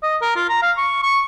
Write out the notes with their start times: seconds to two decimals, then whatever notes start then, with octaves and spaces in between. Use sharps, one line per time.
0.03 D#5
0.22 A#4
0.36 F4
0.49 A#5
0.62 F5
0.77 C#6
1.03 C#6